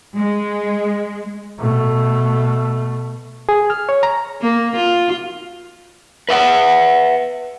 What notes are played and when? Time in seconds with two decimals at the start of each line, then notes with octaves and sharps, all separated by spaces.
0.16 G#3
1.60 B2 A3
3.49 G#4
3.70 F6
3.89 C#5
4.03 A#5
4.41 A#3
4.76 F4
6.29 B4 E5 F#5